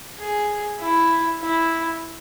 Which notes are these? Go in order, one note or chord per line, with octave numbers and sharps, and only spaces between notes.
G#4
E4
E4